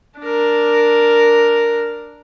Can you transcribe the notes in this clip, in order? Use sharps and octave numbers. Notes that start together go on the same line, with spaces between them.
D4 A#4